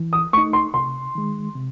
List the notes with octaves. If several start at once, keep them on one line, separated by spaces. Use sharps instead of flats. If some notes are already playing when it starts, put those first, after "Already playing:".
Already playing: E3
D#6
A3 D#4 C#6
C6
C3 C6
D#3 G#3
C3